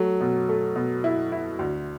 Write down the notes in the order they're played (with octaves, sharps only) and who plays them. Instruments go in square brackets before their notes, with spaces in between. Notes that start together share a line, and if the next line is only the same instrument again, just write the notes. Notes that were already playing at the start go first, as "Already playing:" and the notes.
Already playing: [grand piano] F#3 [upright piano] A3
[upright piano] B2
A3
B2
E4
E4
D2